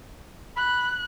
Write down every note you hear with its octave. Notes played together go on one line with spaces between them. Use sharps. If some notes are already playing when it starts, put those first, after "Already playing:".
B5 F#6